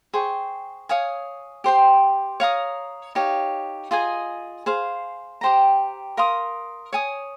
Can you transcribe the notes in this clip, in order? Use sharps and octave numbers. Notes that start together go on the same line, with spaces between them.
G#4 C5 G5 C#6
C#5 F5 G#5 D#6
G4 C5 G5 C6
C#5 F5 A#5 D#6
D#4 G4 C#5 F5
F4 G#4 D#5 G#5
G#4 C5 F5
G4 C5 G5 A#5
A#4 F5 C6 D#6
C#5 G#5 D#6